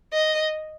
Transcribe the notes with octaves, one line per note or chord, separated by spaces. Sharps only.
D#5